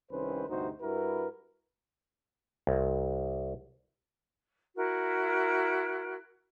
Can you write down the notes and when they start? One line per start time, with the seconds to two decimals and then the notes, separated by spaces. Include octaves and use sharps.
0.11 C2 D#3 C#4 B4 C5
0.48 D2 G2 C3 D#4 F#4 C5
0.82 G2 E4 F#4 A#4 B4
2.67 C2
4.76 E4 F#4 A#4